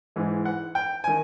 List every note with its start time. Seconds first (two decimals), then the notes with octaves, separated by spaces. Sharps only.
0.16 G#2 E3 G#3
0.45 F#5
0.75 G5
1.04 D#3 G#5